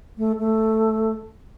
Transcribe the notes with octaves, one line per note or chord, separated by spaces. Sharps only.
A3
A3